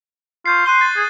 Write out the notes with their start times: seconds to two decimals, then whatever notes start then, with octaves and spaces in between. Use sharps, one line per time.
0.46 F4 C#6 G6 C7
0.66 C6 F#6 D#7 G7
0.81 A6
0.96 G#4